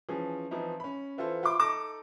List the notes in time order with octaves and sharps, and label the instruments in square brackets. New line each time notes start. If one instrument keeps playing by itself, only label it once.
[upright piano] E3 F3 C#4 G#4
E3 F3 C4 D#4 E4
C#4 B5
E3 E4 F4 A4 C5
F4 E5 B5 C6 D6
D#4 A4 D6 A#6 E7